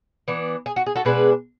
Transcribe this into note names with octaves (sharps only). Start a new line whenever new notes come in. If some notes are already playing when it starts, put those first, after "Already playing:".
E3 B3 D4
G#4
F#4
G#4
F#4 A4
B2 G#3 D4 G#4 B4